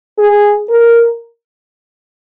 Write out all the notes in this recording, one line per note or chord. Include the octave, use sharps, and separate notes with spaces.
G#4
A#4